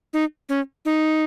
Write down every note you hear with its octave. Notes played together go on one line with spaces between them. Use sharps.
D#4
C#4
D#4